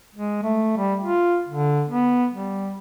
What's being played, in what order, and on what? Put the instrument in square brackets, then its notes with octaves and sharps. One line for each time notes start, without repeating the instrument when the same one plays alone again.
[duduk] G#3
A3
G3
F4
D3
B3
G3